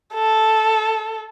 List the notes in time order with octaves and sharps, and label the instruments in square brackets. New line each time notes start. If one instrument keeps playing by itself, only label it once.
[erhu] A4